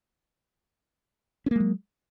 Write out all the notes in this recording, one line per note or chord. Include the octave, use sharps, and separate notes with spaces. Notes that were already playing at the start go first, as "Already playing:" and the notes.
F#3 G#3 A#3 C#4